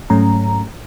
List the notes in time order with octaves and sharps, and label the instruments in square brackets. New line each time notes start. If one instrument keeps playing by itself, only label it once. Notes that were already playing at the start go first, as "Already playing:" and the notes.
[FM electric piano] G#2 F#3 A3 C#4 A#5